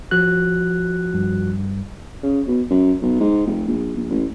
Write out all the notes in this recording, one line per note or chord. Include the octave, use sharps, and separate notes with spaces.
F3 F#4 F#6
G2
C#3
B2
F#2
B1
G#2
F1
A#1
A#1
A1